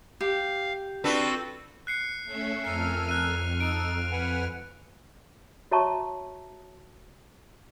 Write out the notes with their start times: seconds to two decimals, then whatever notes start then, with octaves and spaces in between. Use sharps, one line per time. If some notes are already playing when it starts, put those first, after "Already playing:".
0.21 G4 F5
1.04 C4 D4 F4 F#4 A4 B4
1.87 F#6 C7 C#7
2.25 A3 C#4 E5
2.64 F2 A4 A#4 G#5 F6 C7
3.09 F#6 D#7
3.60 D#4 A4 D7
4.12 B4 F#5 G#5
5.71 F#4 C#5 E5 A5 A#5 C#6